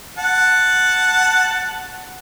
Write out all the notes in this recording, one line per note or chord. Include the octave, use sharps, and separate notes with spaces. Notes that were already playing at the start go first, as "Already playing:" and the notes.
F#5 A5